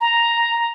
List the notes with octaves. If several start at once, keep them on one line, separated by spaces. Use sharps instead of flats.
A#5